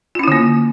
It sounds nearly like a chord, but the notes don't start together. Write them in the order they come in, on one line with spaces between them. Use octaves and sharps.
F4 C#4 E4 D3 A#3